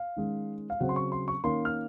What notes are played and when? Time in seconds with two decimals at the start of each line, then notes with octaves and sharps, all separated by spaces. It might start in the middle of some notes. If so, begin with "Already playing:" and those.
Already playing: F5
0.16 D#3 G#3 C#4
0.70 F5
0.80 C#3 F#3 C4 F#5
0.89 C6
0.96 C#6
1.12 C6
1.28 C#6
1.44 D#3 A#3 C#4 C6
1.65 F6